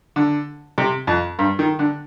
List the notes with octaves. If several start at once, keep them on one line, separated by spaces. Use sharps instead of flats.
D3
C3
F2
G2
D#3
D3